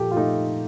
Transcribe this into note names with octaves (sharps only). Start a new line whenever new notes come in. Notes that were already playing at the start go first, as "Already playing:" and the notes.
Already playing: A#2 F3 G4 A4
F4
A3 D#4